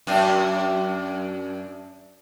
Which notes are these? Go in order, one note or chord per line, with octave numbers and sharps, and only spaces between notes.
F#2 D4